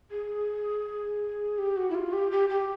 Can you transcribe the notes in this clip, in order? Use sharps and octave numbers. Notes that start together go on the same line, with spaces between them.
G#4
G4
F#4
E4
F4
G4
G4
G4